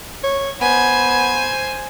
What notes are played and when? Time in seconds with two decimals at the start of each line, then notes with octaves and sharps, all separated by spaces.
0.23 C#5
0.61 B3 C5 G#5